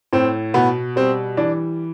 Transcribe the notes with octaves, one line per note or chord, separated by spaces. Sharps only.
A2 C4
B2 B3
G3 C4
E3 D4